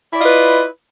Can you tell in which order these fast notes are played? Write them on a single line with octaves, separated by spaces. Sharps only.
E4 D5 F4 D#5 B4